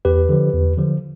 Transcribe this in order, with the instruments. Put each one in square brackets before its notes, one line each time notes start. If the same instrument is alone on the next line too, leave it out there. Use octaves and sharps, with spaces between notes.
[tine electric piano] E2 G4 B4
D3 F3
E2
D3 F3